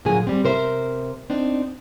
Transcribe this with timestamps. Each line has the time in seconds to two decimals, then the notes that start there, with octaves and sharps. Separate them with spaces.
0.05 A#2 D3 F#3 G#4 G#5
0.27 G3 C4
0.44 C3 A#4 C5 E5
1.30 C4 D4 D#4